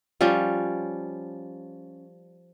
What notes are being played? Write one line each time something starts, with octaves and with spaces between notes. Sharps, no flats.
F3 G3 C#4